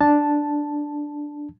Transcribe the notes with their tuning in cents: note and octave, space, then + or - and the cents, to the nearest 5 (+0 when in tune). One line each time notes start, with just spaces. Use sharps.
D4 +0 A5 +0